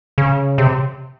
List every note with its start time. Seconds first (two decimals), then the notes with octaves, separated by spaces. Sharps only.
0.18 C#3
0.58 C3